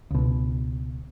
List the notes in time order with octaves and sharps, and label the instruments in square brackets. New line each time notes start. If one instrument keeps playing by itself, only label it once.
[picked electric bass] C#2 B2